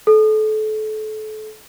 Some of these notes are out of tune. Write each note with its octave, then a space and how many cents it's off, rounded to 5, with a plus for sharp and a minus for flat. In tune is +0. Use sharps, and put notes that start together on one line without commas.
A4 -30